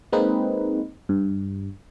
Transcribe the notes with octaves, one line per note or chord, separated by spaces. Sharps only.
G#3 A#3 C4 D#4 B4
G2